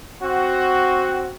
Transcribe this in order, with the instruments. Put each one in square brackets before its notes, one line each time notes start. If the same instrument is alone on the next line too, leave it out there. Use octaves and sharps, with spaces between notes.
[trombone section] C4 F#4